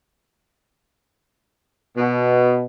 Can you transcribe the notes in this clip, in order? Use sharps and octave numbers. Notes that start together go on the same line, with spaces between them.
B2